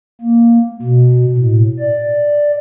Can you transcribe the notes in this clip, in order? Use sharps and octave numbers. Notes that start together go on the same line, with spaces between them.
A#3
B2
A2
D5